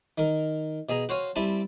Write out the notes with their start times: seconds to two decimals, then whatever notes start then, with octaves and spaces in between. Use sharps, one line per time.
0.18 D#3 A#4
0.89 B2 G#4 G#5 A#5
1.09 F#4 C5 C#5 F5 G#5
1.36 G3 C4 E4 G#5 A5